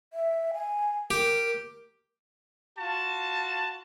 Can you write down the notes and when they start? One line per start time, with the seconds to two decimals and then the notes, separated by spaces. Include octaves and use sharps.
0.13 E5
0.54 G#5
1.11 G4 A#4
2.78 F4 F#4 A5